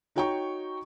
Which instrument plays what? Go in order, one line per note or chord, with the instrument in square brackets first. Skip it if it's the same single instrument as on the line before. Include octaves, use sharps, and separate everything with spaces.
[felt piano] D#4 F#4 C#5 G5 A#5 C#6